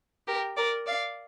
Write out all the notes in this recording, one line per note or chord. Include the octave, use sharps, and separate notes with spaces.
G4 A#4
A#4 D5
D5 F5